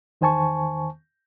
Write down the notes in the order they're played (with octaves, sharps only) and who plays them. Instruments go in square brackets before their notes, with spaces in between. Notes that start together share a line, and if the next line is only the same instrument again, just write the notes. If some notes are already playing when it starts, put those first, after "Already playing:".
[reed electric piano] E2 D#3 C5 G#5 A5 C#6